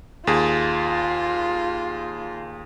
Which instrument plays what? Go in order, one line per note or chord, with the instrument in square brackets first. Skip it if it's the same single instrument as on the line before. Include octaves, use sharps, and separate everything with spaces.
[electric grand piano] D#2 G#4 [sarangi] F4